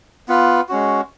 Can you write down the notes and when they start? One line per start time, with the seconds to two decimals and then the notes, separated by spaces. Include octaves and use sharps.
0.28 B3 F4 B4
0.69 G#3 C#4 F#4